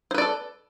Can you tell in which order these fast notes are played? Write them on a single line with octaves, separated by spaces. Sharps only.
C5 B4 D5 A4